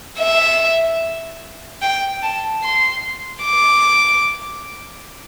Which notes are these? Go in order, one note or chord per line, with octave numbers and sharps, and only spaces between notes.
E5
G5
A5
C6
D6